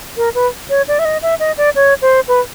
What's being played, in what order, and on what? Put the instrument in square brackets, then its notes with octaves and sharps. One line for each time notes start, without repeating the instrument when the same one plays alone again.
[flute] A#4
B4
C#5
D5
E5
D#5
E5
D#5
D5
C#5
C5
B4